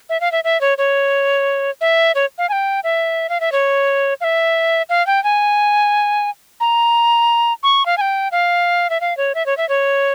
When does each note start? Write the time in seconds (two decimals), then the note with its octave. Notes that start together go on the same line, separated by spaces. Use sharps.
0.09 E5
0.21 F5
0.32 E5
0.44 E5
0.61 C#5
0.78 C#5
1.81 E5
2.15 C#5
2.38 F5
2.49 G#5
2.52 G5
2.84 E5
3.29 F5
3.40 E5
3.52 C#5
4.21 F5
4.24 E5
4.89 F5
5.07 G5
5.24 G#5
6.60 A#5
7.63 C#6
7.86 F5
7.97 G#5
8.01 G5
8.32 F5
8.90 E5
9.01 F5
9.17 C#5
9.35 E5
9.46 C#5
9.57 E5
9.69 C#5